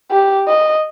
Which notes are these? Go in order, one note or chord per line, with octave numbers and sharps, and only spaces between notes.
G4
D#5